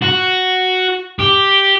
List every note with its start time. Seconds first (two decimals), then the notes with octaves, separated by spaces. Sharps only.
0.02 F#4
1.19 G4